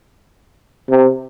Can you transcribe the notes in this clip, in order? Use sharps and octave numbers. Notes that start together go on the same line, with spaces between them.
C3